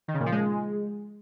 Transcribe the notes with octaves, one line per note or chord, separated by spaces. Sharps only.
D#3
C#3
A#2
F3
G#3